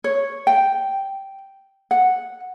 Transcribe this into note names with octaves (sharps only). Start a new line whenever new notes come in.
C#5
G5
F#5